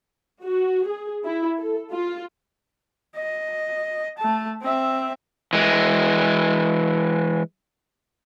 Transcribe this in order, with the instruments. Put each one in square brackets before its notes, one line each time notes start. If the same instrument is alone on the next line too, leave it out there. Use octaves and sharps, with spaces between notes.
[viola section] F#4
G#4
E4
A4
F4
[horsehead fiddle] D#5
A3 A5
C4 E5
[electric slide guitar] E3 G#3